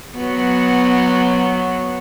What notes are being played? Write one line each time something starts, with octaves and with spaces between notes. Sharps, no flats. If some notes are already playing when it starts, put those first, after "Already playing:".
F#3 B3